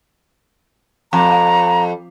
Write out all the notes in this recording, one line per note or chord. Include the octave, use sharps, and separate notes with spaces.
F2 A#5